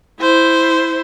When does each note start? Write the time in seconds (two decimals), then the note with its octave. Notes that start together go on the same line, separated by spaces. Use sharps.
0.20 E4 C5